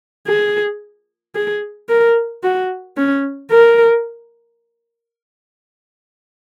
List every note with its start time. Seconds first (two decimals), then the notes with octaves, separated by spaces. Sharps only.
0.27 G#4
1.35 G#4
1.89 A#4
2.43 F#4
2.97 C#4
3.51 A#4